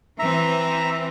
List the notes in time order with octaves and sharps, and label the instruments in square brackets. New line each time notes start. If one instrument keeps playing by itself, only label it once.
[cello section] E3 C4 [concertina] E5 A#5